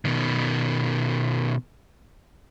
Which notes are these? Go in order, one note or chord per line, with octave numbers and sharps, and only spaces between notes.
B2 D#3